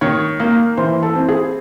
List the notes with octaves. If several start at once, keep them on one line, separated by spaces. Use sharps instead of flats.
D#3 C#5
A#3
E3 C5
A4
C4
G#4